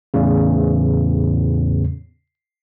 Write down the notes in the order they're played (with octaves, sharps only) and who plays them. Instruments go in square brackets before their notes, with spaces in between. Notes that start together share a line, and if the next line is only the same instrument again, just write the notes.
[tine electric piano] E2 A2 C#3